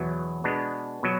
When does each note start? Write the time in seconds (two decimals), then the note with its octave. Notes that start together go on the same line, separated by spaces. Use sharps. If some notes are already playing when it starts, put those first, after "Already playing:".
Already playing: E2 B2 F#3 B3
0.44 B2 G#3 B3 D4
1.03 B2 F#3